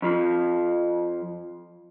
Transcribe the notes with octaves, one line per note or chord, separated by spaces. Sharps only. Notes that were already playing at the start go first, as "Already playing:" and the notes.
F2 F3